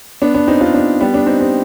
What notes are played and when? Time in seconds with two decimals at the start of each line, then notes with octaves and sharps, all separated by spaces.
0.22 B3 D4
0.34 B3 D4
0.48 C4 D#4
0.61 D4 F4
0.74 B3 D4
1.01 G3 B3
1.14 B3 D4
1.26 C4 D#4
1.40 C4 D#4